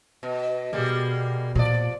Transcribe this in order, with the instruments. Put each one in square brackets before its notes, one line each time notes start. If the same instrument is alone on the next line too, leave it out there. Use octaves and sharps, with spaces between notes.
[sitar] B2
[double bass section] B2 [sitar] G3 G#3 A#3
[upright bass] A#2 [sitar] F3 D5